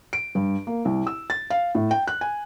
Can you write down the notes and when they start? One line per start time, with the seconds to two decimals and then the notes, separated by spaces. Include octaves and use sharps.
0.13 D7
0.35 G2
0.67 A#3
0.85 C2
1.07 E6
1.30 A6
1.50 F5
1.75 A2
1.91 G5
2.08 F#6
2.21 G#5